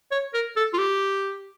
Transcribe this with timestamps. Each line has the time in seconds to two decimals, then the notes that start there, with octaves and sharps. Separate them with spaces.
0.12 C#5
0.34 A#4
0.56 A4
0.74 F4
0.79 G4